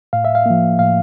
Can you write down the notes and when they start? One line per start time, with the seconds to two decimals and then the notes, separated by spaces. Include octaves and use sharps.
0.13 A2 F5
0.25 E5
0.35 F5
0.46 F3 A#3
0.79 A2 F5